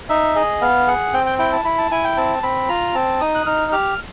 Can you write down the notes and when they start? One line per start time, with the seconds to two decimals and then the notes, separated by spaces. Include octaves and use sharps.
0.09 D#4 E5
0.35 G#4 D#5
0.61 B3 F5
0.87 G#4 F#5
1.13 C4 G5
1.26 G5
1.39 E4 G5
1.52 A5
1.65 E4 B5
1.78 A5
1.91 E4 G#5
2.04 G5
2.17 C4 A5
2.43 C4 B5
2.69 F4 A#5
2.95 C4 A5
3.21 D#4 D#6
3.35 F#6
3.46 D#4 F6
3.72 G4 F6